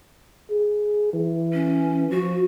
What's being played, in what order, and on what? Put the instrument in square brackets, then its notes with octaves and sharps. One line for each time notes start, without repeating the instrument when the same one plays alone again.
[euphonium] G#4
E3
[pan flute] C#4
[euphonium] F3 [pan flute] F#4